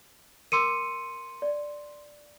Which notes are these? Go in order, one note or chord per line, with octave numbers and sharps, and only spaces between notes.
A#4 C6 D6 E6 C#7 D#7
D5